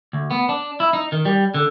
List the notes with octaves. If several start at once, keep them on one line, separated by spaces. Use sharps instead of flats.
D2
B3
D4
E4
D#4
D#3
G3
D3